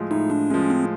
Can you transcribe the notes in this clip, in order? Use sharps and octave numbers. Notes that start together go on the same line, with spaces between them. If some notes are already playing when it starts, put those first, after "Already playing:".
Already playing: A2 F3 G#3
A2 D#4
D4
F3 G#3 C#4
C4